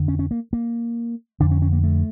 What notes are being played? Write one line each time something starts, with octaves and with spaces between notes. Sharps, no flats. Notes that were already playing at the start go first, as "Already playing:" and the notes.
Already playing: F2 D3
C#4
C#4
A#3
A#3
F2 D3 D4
C#4
C#4
A#3
A3